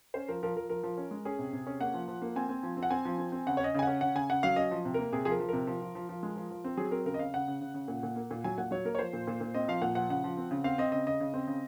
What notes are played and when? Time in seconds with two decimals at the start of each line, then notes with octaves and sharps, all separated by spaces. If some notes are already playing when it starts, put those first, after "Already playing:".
0.14 C#4 C5
0.28 F3 A#4
0.43 F3 A#4
0.56 F3 A#4
0.70 F3 A#4
0.83 F3
0.98 C#4
1.11 G#3
1.25 C#4 G#4
1.39 C3
1.53 C3
1.67 C#4
1.80 A#3 F#5
1.94 F3
2.08 F3
2.22 A#3
2.36 C4 G#5
2.49 C4
2.63 F3
2.77 C4
2.83 F#5
2.90 C4 G#5
3.05 F3
3.18 C4
3.32 C4
3.46 C#3 F#5
3.57 C#5
3.60 C#4 D#5
3.75 C#3 G#5
3.83 C#4 F#5
4.01 C#3 F#5
4.15 C#3 G#5
4.30 C#3 F#5
4.43 F#3 F5
4.56 C#4 D#5
4.71 F3
4.85 C3
4.94 A#3 A#4
5.12 C3 G#4
5.25 F3 G#4
5.31 A#4
5.40 F3
5.49 C3 A#4
5.67 F3
5.82 F3
5.95 F3
6.09 F3
6.23 G#3
6.36 F3
6.51 F3
6.64 C4
6.77 F#3 G#4
6.91 C4 A#4
7.05 C#3 A#4
7.14 D#5
7.19 C#3 F5
7.34 C#3 F#5
7.48 C#3
7.61 C#3
7.74 C#3
7.88 A#2
8.03 A#2
8.16 A#3
8.31 A#2
8.44 F#3 G#5
8.58 A#2 F#5
8.71 F#3 C#5
8.85 A#3 A#4
8.95 C#5
8.99 F3 C5
9.13 A#2
9.27 A#2
9.41 A#2
9.54 C4 D#5
9.68 F3 F5
9.82 A#2 F#5
9.95 F3 F#5
10.09 C#3 F#5
10.24 F3
10.37 C4
10.51 C#3
10.64 C4 F5
10.78 C4 D#5
10.92 C#3 D#5
11.06 C#3 D#5
11.20 C#3
11.34 C4
11.47 C#3